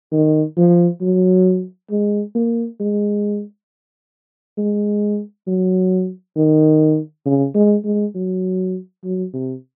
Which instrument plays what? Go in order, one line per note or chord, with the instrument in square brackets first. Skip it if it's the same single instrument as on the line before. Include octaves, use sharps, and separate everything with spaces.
[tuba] D#3
F3
F#3
G#3
A#3
G#3
G#3
F#3
D#3
C#3
G#3
G#3
F#3
F#3
C3